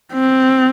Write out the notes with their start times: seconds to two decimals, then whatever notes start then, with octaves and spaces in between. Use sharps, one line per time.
0.13 C4